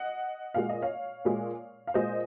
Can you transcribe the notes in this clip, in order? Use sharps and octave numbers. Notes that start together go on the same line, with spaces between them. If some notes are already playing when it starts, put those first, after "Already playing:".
Already playing: D#5 F#5
A#2 G#3 F5
D#5
C#5 F5
A#2 G#3
F5
A#2 G#3 C5 D#5